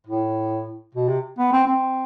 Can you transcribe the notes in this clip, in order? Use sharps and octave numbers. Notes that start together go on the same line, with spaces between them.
A2
B2
C3
B3
C4
C4